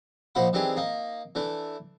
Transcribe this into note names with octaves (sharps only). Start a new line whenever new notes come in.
A#1 F3 C5 D#5 F#5 B5
D#3 E3 C4 D4 G4 G#4
A#3 D#4
E3 A3 D4